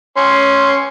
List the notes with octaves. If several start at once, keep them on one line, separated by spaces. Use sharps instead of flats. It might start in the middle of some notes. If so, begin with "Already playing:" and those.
C#4 C6